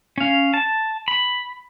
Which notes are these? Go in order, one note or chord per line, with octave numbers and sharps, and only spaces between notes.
C#4 F5
A5
B5